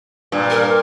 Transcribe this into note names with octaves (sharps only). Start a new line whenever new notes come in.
G2 A#2
A#4